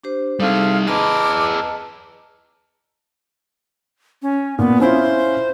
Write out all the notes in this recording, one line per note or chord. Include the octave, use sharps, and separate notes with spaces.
D4 G4 C5
G3 C4 D#4 G#4 A4 F5
G#4 B4 D#5 A5 A#5 D6
C#4
A#2 B3
C#4 E4 F4 C5